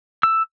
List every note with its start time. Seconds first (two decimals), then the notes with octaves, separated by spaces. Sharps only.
0.23 E6